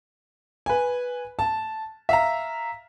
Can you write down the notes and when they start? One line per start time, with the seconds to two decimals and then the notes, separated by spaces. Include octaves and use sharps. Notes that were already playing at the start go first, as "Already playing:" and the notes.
0.66 B4 G#5
1.39 A5
2.09 E5 F5 A#5